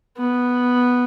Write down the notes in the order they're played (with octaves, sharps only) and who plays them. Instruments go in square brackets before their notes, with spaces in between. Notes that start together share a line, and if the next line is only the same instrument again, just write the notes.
[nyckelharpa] B3